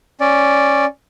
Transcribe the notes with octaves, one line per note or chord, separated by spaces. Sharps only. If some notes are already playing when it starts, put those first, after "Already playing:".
C#4 D5